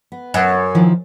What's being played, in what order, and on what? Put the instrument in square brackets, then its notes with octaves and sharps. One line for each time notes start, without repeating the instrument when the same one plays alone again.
[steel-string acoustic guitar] B3
[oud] F#2
[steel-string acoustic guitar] D#3 F3 E4